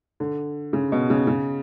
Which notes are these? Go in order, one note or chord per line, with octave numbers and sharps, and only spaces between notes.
D3
C#3
B2
C#3
C#3